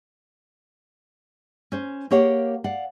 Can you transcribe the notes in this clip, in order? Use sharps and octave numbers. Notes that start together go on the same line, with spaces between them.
C#4 C5
A#3 G4 A#4 C#5 F5 F#5
D5 F5 F#5